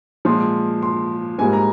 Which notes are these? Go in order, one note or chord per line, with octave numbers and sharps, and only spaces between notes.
A#2 F3 G#3 C6
C6
G#2 G3 A#3 G#5
A#5